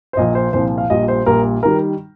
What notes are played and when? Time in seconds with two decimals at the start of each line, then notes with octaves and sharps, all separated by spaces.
0.13 C5
0.17 A#1 A#2 F3 D#5
0.35 C5
0.53 C2 A#2 F3 C5
0.78 F5
0.90 A#1 A#2 G3 D#5
1.08 C5
1.26 A#1 A#2 G3 A#4
1.63 D#3 G3 A#4